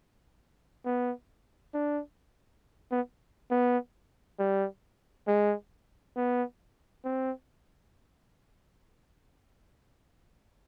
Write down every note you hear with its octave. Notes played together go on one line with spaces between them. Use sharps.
B3
D4
B3
B3
G3
G#3
B3
C4